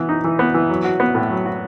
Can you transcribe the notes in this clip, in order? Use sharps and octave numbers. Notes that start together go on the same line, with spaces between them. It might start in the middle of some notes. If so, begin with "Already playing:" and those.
Already playing: E3 B3
D#4
E3
B3
E3
F#3
F#4
B3
A2
F#3
F#4